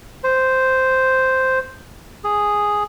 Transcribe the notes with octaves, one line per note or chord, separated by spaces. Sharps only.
C5
G#4